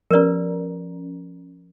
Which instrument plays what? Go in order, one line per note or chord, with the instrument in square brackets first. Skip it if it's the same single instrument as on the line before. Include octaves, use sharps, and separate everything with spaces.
[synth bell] F3 C#4 [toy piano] A#4 B4 D5